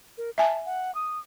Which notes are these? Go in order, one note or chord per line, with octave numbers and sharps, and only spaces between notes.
A#4
E5 G#5 A5
F#5
D#6